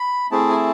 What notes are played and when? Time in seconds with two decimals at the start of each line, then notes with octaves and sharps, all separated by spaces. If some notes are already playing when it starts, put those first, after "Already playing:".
Already playing: B5
0.31 A3 C4 E4 G#4 A5
0.51 G#5
0.56 A5